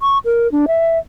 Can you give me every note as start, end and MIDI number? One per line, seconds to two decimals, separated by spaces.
0.01 0.18 85
0.25 0.50 70
0.52 0.66 62
0.68 0.98 76